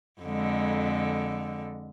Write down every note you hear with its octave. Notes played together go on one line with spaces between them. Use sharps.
F2 D3 G#3